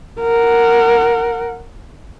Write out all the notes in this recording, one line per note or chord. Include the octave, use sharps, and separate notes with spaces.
A#4 F#5